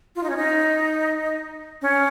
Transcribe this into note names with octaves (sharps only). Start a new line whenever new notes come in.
F4
D#4
C#4
D#4
C#4